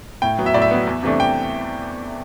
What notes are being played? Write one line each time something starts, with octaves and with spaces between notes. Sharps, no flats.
A2 G5
F#3 B3
E5
A2 D5
E5
F#3 B3
E2
C3 E3 A3 D4
G5